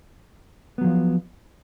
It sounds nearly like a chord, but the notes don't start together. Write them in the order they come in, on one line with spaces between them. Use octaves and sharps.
B3 F#3 F3